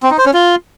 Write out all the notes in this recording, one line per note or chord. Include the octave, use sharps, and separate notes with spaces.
C4
D#4
C5
C#4
F4